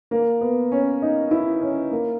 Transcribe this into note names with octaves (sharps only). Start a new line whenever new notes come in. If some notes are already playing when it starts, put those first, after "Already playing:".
A#3
B3
C#4
D#4
E4
C#4
A#3